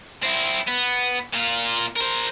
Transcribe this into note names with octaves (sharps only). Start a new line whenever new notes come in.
C4 E4
B3
A#2 F4
A#4 C5